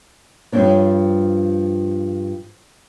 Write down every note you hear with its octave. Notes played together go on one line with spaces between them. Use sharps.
G2 F3 A#3 C4 D4 C#5